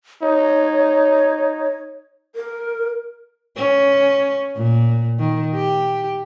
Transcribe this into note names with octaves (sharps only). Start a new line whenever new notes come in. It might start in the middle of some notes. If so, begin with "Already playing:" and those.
D#4 C#5
A#4
C#4
A#2
D#3
G4